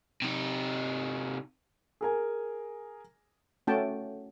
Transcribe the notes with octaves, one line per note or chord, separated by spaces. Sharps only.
C3 D#4
G#4 A#4 G#5
A3 C#4 F#4 G5 A5